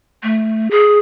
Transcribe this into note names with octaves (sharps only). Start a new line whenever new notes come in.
A3
G#4